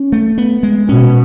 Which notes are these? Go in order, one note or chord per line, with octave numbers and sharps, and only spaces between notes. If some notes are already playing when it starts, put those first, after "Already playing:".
Already playing: C#4
A3
B3
G#3
B2 C#4